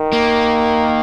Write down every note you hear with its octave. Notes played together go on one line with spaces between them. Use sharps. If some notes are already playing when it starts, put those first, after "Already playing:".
Already playing: D#3
A#3